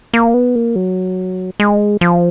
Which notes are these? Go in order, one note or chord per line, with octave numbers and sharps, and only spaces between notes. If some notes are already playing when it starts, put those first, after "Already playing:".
A#3
B3
A#3
F#3
G#3
F3